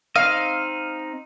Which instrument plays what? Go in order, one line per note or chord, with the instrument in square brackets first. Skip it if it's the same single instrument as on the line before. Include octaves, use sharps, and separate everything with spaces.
[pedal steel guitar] C4 D#4 D#5 [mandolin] F5